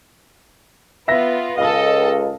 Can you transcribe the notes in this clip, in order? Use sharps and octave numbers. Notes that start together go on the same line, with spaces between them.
B3 F4 E5 A#6
C#2 A4 D#5 F5 D#6